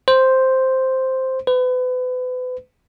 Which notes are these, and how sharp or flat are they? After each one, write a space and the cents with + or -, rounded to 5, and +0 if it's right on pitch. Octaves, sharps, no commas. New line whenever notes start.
C5 +0
B4 +35